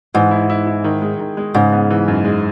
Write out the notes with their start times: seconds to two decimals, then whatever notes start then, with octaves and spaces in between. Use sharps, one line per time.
0.14 G#2 E3
0.31 E4
0.50 E4
0.67 E4
0.84 D#3
1.02 G#3
1.20 D#3
1.37 G#3
1.54 G#2 C#3
1.72 B3
1.90 E3
2.08 F#2
2.25 G#3